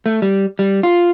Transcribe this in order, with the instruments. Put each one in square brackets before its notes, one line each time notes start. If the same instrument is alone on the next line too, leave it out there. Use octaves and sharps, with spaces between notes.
[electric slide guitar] A3
G3
G3
F4